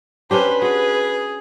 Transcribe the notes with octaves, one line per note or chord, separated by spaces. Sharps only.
C#4 D4 G4 B4 C5
F#4 G#4